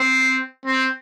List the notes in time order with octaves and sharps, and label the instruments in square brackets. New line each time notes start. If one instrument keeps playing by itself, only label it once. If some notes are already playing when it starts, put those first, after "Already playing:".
Already playing: [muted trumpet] C4
C4